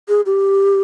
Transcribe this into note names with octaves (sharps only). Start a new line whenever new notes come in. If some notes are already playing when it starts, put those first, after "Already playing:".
G#4
G4